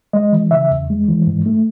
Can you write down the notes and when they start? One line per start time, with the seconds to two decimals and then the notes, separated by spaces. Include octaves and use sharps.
0.13 G#3 D#5
0.33 E3
0.51 C#3 E5
0.71 E2
0.90 G#3
1.08 E3
1.27 G#2
1.46 A3